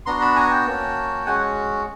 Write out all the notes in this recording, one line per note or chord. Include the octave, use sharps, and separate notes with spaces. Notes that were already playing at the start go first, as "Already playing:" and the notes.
B3 D4 F#4 A#5 C6
A5 B5
G#5 A#5
G5 A5
A#3 C#4 F#4
G#3 C#4 F#4 F#5 G#5